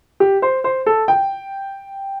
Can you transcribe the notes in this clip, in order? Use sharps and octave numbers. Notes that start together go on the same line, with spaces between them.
G4
C5
C5
A4
G5